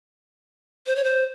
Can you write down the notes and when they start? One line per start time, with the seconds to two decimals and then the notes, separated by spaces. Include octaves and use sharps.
0.86 C5
0.96 C#5
1.04 C5